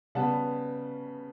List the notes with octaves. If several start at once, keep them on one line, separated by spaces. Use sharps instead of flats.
C#3 G3 B3 F#5 A5